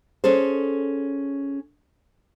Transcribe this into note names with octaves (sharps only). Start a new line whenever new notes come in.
C#4 G#4 A4 C5